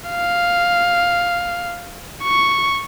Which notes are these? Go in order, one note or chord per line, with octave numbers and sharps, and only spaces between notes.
F5
C#6